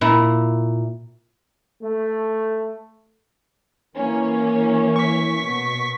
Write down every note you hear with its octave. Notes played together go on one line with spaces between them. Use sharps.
A#2 E4 A#5
A3
E3 A#3 C#4
C#6 B6
B2